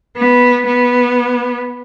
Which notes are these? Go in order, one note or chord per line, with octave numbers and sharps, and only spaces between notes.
B3
B3